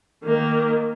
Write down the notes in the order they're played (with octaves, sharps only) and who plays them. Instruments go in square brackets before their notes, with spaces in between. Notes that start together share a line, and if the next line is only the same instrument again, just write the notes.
[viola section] D#3 [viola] A#3